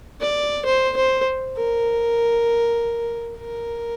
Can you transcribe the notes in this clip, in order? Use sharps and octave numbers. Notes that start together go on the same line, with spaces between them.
D5
C5
C5
A#4
A#4